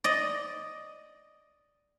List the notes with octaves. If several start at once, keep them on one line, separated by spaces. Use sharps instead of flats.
D5 D#5